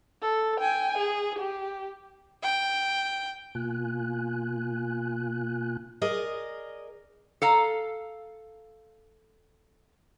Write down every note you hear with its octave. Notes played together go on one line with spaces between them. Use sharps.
A4
G5 G#5
G#4
G4
G5
B2 A#3 F4 G#5 F#6
G#4 A#4 D5 D#5
A4 F5 A#5